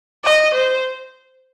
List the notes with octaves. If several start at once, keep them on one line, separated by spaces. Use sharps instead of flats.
D#5
C5